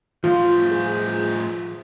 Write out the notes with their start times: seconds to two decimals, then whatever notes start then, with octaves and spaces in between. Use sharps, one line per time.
0.24 A2 F3 F4 C5
0.71 G#4